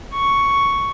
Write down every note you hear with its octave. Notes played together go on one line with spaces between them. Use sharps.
C#6